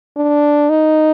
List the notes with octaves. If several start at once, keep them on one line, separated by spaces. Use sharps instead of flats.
D4
D#4